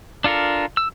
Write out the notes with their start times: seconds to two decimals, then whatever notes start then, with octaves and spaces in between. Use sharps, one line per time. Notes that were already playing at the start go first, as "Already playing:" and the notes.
0.24 D4 F4 A4 A#4
0.77 E6